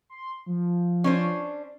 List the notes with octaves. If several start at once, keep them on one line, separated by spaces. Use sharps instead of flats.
C6
F3
C#4 D4 C5